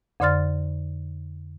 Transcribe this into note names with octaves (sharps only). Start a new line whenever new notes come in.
F2 D3 D5 C6 F6 A6